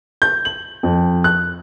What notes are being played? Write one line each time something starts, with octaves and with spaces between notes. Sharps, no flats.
G6
F#7
F2
F#6